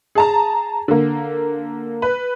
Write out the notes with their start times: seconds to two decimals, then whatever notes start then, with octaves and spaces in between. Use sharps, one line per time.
0.15 G#4 A5 A#5
0.88 D3 A#3
2.02 B4